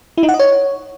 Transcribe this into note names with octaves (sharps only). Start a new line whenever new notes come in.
E4
D#4
F#5
D#5
C#5